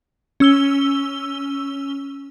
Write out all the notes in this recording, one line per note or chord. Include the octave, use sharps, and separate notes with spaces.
C#4 E6 G7